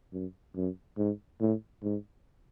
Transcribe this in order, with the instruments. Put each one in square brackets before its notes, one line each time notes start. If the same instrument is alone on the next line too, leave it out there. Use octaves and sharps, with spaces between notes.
[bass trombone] F#2
F#2
G#2
A2
G#2